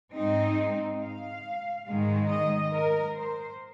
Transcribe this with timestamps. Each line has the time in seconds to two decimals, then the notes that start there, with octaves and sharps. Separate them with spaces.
0.15 G#2 G#3 C4 D#4
1.02 F5
1.87 G#2 D#3 G#3
2.30 D#5
2.73 A#4
3.15 C5